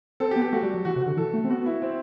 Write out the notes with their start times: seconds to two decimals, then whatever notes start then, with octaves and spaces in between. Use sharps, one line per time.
0.20 C4 A4
0.31 G4
0.36 B3
0.42 G4
0.52 A3 F#4
0.63 G3
0.74 F#3
0.85 E3 F#4
0.96 C3
1.01 F#4
1.07 D3
1.17 E3 A4
1.34 A3
1.44 C4
1.50 B3 F#4
1.66 E4
1.82 C4